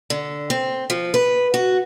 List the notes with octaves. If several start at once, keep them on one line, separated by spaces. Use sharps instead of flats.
D3
C4
F3
B4
F#4